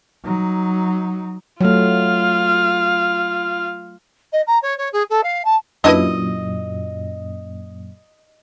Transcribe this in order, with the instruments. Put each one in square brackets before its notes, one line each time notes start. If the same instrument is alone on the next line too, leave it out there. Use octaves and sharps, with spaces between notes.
[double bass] F#3 D#4
[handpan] F#3 A3 [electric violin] F4 F5
[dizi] D#5
A#5
C#5
C#5
G#4
A4
F5
A5
[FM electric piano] F#2 A#2 [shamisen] D4 E4 B4 [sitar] D#5